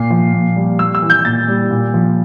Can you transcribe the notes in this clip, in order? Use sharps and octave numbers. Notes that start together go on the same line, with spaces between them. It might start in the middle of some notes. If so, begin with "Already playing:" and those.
Already playing: A#2 C7
F3
A#2
G3
G3 E6
E6
E3
G6
A#2 A6
G3
A#2
F3